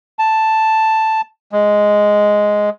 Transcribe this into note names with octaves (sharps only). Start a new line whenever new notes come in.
A5
G#3